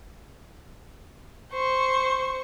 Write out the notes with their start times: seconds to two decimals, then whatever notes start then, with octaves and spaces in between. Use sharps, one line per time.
1.51 C5 C#6